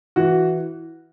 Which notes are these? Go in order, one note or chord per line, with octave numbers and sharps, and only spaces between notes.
E3 F#4